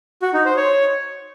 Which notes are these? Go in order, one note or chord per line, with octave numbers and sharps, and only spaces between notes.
F#4
D#4
C5
C#5